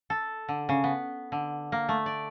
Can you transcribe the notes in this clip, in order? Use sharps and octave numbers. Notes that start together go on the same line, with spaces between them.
A4
D3
C#3
B3
D3
A#3
A3
D5